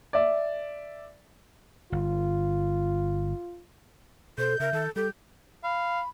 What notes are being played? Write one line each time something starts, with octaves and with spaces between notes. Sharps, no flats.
D5 E5
G1 F4
B2 A4 C5 G6
C#3 A#4 E5
D#3 A4
G3 G4 A4 G6
F5 B5